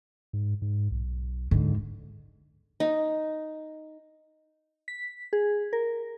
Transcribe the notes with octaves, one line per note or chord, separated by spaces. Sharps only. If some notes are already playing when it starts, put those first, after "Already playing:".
G#2
G#2
B1
D2 G#2 D3
D#4
B6
G#4
A#4